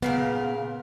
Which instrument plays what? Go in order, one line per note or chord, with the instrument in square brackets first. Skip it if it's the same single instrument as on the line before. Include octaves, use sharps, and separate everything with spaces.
[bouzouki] A#2 C#3 A#4 [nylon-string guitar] B3